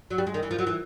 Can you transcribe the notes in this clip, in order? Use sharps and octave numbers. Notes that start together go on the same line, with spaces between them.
F#3
G3
G#3
D#3
E3
F3
F#3
E3